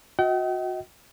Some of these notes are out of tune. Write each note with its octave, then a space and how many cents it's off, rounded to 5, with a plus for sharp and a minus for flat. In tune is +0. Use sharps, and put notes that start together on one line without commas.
F#4 -25 D#5 +35 G5 -45